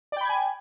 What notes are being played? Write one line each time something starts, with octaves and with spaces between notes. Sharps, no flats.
D5 G5 G#5 B5 G#6